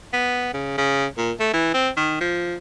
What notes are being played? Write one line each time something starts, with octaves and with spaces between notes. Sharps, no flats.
B3
C#3
C#3
A#2
A3
E3
C4
D#3
F3